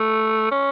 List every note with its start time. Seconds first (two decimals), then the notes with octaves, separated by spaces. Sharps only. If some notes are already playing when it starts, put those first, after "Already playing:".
Already playing: A3
0.51 C#4